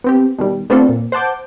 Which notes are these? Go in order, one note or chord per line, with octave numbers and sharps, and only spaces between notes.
B3 C4 G4
B2 D#3 G3
A3 B3 C4 D4 F4 A4
A#2
C5 F#5 A5 D6 G6